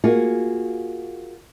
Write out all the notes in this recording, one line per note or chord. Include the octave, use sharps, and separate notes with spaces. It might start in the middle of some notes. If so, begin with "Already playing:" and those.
A#3 F4 F#4 G#4